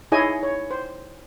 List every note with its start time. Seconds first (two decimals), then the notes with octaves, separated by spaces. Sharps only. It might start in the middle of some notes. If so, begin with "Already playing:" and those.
0.12 D#4 E4 G#4 C#5 D#5 G#5
0.43 C#5
0.71 C5